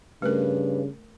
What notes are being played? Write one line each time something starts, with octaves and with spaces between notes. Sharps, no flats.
G2 C#3 A3 A#4 B4